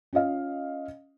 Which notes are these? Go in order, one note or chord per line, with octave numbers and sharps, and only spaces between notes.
C#4 F4 D#5 F5